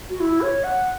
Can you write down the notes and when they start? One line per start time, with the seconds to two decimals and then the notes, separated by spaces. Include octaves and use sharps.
0.10 F#4
0.20 E4
0.41 C#5
0.64 F#5